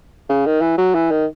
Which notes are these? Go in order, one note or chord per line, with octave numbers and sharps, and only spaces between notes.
C#3
D#3
E3
F#3
E3
D#3